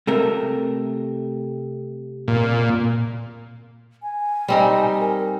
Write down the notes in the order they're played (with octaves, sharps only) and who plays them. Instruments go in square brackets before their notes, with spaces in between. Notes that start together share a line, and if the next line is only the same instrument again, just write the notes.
[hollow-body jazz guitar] C3 A3 A#4
[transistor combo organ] A#2
[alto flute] G#5
[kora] G3 C4 D#4
[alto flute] A#4